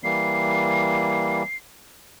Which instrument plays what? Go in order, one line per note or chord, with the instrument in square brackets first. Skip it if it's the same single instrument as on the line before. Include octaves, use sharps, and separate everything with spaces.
[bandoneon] E3 G3 A#3 [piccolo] C7